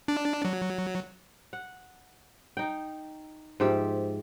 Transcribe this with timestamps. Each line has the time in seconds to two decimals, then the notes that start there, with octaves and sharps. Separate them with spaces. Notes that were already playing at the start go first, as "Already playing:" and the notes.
0.08 D4
0.45 F#3
1.53 F#5
2.57 D#4 G5
3.60 G#2 F3 G4 E5